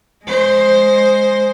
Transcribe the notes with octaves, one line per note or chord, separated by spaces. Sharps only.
G#3 C5